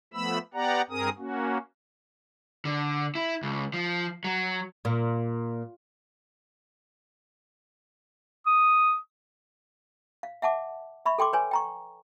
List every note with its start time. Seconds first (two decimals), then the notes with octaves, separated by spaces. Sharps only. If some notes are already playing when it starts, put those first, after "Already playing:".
0.14 F3 A3 B3 B5 E6
0.54 B3 G4 D5 F#5 A#5
0.90 G2 C4 G#4 A#4 D#6
1.18 A#3 C#4 F#4
2.65 D3
3.15 E4
3.43 C#2
3.74 F3
4.24 F#3
4.85 A#2
8.46 D#6
10.23 F5
10.42 E5 F#5 A5 D6
11.06 E5 B5 C#6
11.18 A4 G5 C6 D6
11.33 B4 C#5 G#5
11.51 G5 A#5 C#6